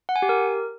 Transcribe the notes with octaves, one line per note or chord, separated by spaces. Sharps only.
F#5
G#5
G4
A#4